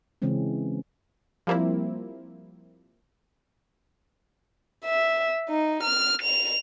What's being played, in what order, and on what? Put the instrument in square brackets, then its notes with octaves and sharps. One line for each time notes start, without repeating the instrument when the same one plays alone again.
[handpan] C#3 E3 G#3 C4 C#4
[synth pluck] F3 G3 A#3 C4 E4
[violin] E5
D#4
F6
F7